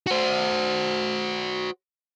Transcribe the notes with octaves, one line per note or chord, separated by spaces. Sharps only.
F#4 C5